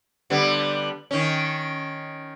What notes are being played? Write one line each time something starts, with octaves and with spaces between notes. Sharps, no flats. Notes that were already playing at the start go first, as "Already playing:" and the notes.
D3 G3 B3
D#3 C#4